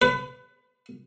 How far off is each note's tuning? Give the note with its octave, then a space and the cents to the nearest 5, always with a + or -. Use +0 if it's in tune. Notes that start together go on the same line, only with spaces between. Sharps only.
B4 +25